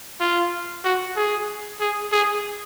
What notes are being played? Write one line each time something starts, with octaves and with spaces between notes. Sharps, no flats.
F4
F#4
G#4
G#4
G#4